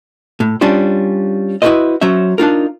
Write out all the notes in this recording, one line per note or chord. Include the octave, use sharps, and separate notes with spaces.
A2
G3 C#4 D4 F4 C5
E4 F#4 A4 B4 C5 D#5
F#3 C#4 C5 E5
D4 D#4 F4 A#4